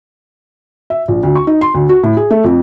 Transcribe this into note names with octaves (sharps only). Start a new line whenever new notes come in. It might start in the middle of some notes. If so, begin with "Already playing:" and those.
E5
A#1
D2
C#6
D#4
C6
D2
F#4
A2
G#4
A3
F2